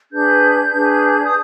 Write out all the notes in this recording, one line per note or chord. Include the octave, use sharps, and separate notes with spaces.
D4 G#4 B4 G6
D4 G#4 B4
D#6